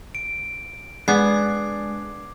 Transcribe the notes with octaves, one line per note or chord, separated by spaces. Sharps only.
D7
G#3 B3 D4 G#4 D6 G#6 C7